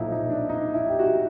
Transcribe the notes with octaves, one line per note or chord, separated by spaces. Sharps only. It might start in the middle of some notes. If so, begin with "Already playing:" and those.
Already playing: B1 A#2 F3 D#4 E4
D#4
D4
D#4
E4
G4
F#4